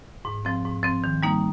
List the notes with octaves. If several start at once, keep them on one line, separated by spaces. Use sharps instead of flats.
G#2
F3 C4
G#2
F3 C4
D#3
G3 A#3 D#4